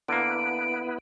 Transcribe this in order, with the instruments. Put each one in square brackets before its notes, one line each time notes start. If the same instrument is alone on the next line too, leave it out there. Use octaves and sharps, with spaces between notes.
[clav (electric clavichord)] D3 A#3 [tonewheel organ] B3 E4 B4 [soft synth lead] D7